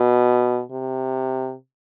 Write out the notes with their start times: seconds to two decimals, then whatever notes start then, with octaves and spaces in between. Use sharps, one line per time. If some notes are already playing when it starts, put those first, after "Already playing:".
Already playing: B2
0.71 C3